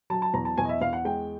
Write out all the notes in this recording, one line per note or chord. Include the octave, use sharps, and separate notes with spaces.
F#3 A5
A5
E2 A#5
A5
E2 G#5
D#5
E5
E2 F5
F#5
G#3 G5